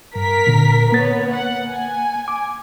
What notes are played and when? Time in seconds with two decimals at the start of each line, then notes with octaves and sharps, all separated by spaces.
0.15 G2 A#4 B6
0.47 A#2 D3
0.92 A#3 B3 C#5 A6
1.33 F#5
1.70 G#5
2.28 D6